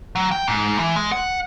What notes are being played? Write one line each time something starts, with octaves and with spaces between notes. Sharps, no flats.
F#3
G5
G#2
E3
G#3
F#5